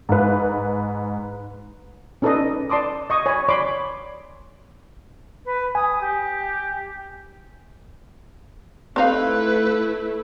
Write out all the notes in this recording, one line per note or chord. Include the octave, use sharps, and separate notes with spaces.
G#2 B4
C#4 D#4 A4 B4 D5 D#5
D5 A5 C6 D6 D#6
D#5 C#6 D#6
C#5 G#5 B5 C#6
C#5 D5 B5 C6 D6
B4
G#5 D#6
G4
A3 C4 D#4 E4 B4 F5